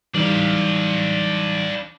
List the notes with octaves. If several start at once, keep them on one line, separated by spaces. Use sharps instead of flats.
E3 G3 D4 D#4 F5